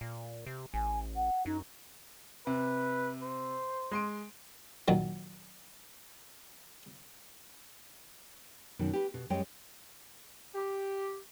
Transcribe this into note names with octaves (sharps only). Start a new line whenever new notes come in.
A#2
C3
A1 G#5
F#5
F#2 D#4
C3 B4
C5
G#3 C6 D7
A#2 D#3 F#3
F#2 B2 D#3
G4 B4
B2
F#2 G3 G#3 C#5 D#5 G5
G4